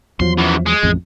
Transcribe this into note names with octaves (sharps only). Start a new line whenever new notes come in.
E2 F3 F#3 C6
F#2 E3
G#3
A1 F2